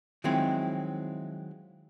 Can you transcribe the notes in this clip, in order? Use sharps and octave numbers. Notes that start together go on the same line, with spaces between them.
D#3 F3 F#3 G#3 C4 E4